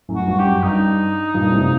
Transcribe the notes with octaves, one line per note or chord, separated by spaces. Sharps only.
F#2 A2
F#4
G2
G4
F#2
G2 D#4
G2 A#2
A2 C3